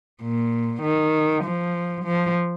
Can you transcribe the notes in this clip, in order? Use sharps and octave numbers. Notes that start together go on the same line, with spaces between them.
A#2
D#3
F3
F3